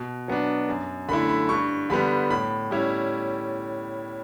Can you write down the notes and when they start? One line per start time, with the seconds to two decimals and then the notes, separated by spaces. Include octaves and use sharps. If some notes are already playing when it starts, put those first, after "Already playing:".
Already playing: B2
0.28 F#3 B3 D4
0.69 F#2
1.08 D3 B5
1.11 A3 E4
1.29 B5
1.49 G2 C#6
1.90 D3 G3 B3 B5
2.30 A2 B5
2.71 G3 C#4 E4